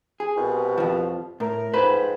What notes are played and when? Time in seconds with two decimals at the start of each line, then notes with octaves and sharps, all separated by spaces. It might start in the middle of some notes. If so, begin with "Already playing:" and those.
0.20 G#4
0.36 C2 B2
0.78 F2 F3
1.40 A2 A#4
1.74 F2 G#2 B4 C5 B5